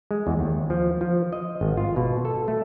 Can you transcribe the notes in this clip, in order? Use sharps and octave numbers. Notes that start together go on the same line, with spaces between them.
G#3
E2
D#2
F3
F3
D#5
G#1
F4
B2
A4
A3